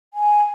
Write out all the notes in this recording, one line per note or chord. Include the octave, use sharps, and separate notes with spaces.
G#5